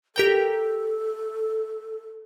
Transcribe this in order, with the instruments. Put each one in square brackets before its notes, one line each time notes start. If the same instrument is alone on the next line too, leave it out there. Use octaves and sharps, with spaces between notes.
[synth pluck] G4 A#4 G5 [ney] A4